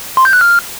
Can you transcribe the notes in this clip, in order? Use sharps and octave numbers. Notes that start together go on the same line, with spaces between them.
C6
G6
F#6
F6